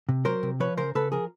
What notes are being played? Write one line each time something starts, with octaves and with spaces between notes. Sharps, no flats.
C3
F#3 A#4 C5
C3
F3 B4 C#5
C#3 A#4 C5
C#3 A4 B4
F3 G#4 A#4